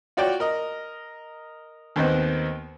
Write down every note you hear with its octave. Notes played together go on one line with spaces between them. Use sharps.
F4 F#4 C#5 D5 G5
A#4 D#5
D#2 D#3 B3 C4 C5